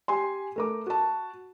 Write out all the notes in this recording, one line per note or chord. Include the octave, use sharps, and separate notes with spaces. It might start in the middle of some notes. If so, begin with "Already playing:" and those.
G4 G#5 C6
A3 A#4 D6
F#4 A5